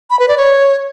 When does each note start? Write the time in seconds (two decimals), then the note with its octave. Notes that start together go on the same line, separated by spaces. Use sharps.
0.10 B5
0.19 B4
0.28 D5
0.38 C#5